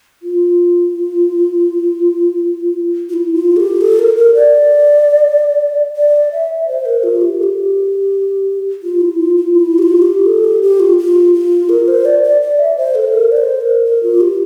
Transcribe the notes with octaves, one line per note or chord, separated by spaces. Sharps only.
F4
F4
E4
F4
A4
G4
A4
A#4
A#4
D5
D5
E5
C5
A#4
F4
G4
A4
G4
F4
E4
F4
F4
E4
G4
F4
G4
A4
G4
G4
F4
F4
F4
A#4
C5
D5
D5
D5
E5
C5
A4
A#4
D5
C5
A#4
A#4
F4
G4